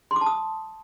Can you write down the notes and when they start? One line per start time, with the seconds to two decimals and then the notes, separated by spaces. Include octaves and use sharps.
0.11 C6
0.16 D6
0.21 A5
0.26 D#6